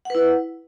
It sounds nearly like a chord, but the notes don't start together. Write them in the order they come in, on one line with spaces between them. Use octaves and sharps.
F#5 B4 E4